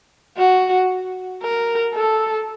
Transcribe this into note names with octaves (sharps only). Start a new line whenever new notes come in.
F#4
A#4
A4